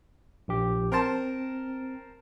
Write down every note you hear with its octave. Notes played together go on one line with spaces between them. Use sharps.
A#1 G4
C4 A#4 C5 A5